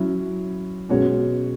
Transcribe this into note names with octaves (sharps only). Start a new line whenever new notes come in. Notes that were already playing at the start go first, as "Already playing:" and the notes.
Already playing: F#3 C#4 E4
B2 G#3 C#4 F#4 C#5